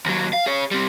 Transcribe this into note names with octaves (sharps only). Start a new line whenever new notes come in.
D#2 F#3
F5
G#4 C#5
G3 C4